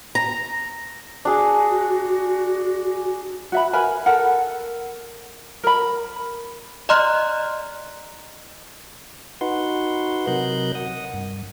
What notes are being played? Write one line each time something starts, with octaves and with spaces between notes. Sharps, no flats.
A#5
D4 F#4 G#4
F#4 E5 B5
A#4 B4 G#5 B5
A4 A#4 F#5
A#4 B5
D5 D#5 A#5 C6 F6 F#6
D#4 F#4 B4 F#5 C6
C3 F#3 A#4 D#5 F#6 G6
F#5 D#6
G2